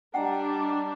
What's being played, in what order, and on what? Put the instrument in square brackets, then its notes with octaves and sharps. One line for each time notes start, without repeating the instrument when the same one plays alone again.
[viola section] G3 D4 [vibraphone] D5 D#5 A#5 [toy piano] F#5 G5